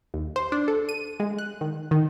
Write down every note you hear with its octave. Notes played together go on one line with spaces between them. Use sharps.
D#2
C5
D4
A4
D#7
G#3
F#6
D#3
D#3